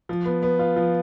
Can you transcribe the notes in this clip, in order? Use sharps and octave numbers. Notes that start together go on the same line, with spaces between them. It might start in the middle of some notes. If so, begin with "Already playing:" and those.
F3
B3
B3
F4
F3